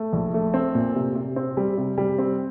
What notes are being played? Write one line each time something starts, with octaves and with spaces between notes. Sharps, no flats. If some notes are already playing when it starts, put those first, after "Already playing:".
Already playing: A3
A#1
A3
C4
A#2
C3
C3
C4
G3
C3
G3
C4